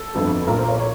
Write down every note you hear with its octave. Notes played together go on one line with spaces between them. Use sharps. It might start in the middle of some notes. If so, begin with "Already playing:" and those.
Already playing: A4
G1 F2 D3
B1 A#2 A#4
C5
C#5
C#5